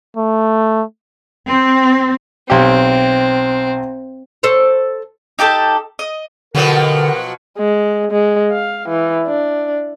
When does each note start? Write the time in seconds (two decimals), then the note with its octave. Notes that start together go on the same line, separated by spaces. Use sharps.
0.17 A3
1.47 C4
2.50 B1 C4 G4
4.43 A4 C5 C#5
5.39 D#4 G4 A4 A5
5.99 D#5
6.55 B2 D3 F3 F#3 G4 A#4 F#5
7.58 G#3
8.12 G#3
8.52 F5
8.89 E3
9.26 D4